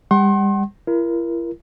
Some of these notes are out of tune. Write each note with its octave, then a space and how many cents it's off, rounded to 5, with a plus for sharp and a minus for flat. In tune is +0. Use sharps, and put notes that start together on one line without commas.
G3 +35 F#5 +35 C6 +35
E4 +45 A#4 +15